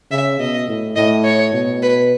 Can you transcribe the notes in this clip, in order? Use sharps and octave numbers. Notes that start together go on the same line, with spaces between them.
C#3 E5
B2 D#5
A2
A2 D#5
C#5
B2
B4